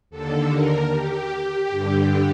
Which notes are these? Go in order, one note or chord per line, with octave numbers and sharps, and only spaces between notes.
D#2 D3 A4
A#4
G4
G2 D3